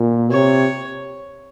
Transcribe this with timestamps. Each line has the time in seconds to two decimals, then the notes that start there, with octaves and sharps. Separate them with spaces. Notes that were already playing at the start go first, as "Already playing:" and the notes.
Already playing: A#2
0.31 C3 C#5